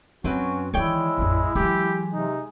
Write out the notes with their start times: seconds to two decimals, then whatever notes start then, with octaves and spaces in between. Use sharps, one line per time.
0.24 F#2 F#3 C4 C#4 F#4 B4
0.74 D#3 E3 G#3 E4 C#5 D5 G5
1.18 A1 F2
1.55 E3 F#3 G#3 G4
2.13 C3 D#4